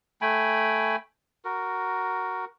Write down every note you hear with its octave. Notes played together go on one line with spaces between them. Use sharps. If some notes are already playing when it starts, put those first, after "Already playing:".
A3 G5 G#5 B5
F#4 A#4